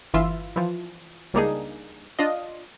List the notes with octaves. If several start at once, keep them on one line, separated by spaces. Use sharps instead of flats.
G1 E3 E4 F4 E5
E3 F3
C#2 G3 A#3 D4 D#4 G#4
D4 F4 D#5